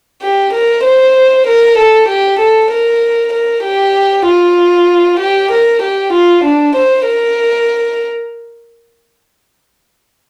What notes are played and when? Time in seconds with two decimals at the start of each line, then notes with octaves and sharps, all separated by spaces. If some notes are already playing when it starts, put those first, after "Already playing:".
0.22 G4
0.53 A#4
0.84 C5
1.47 A#4
1.78 A4
2.08 G4
2.39 A4
2.71 A#4
3.33 A#4
3.64 G4
4.26 F4
5.20 G4
5.51 A#4
5.82 G4
6.13 F4
6.44 D4
6.75 C5
7.07 A#4